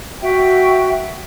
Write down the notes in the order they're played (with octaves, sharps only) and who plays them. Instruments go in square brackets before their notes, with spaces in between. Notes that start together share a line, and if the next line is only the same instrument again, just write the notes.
[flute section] F#4 E5 G5